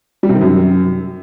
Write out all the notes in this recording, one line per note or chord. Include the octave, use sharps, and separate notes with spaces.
G3
C3
D#3
F#2